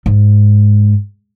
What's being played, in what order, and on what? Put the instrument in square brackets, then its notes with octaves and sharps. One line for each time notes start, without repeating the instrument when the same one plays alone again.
[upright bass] G#2